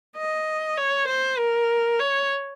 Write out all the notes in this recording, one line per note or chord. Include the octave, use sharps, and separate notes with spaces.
D#5
C#5
C5
A#4
C#5